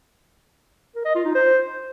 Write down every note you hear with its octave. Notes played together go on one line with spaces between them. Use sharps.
A#4
D#5
F4
D#4
C5